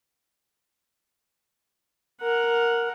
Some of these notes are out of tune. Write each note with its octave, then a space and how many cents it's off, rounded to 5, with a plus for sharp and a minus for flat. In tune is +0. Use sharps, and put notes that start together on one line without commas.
A#4 +0 F#5 -10